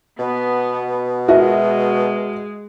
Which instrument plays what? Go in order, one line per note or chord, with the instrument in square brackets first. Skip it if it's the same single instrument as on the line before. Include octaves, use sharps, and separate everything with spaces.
[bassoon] B2 [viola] B3
[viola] G#3 [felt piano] F#4 A#4 D#5 [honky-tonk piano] E5